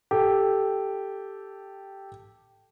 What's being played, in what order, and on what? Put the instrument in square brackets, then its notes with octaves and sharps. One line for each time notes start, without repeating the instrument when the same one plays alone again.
[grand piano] G4 A4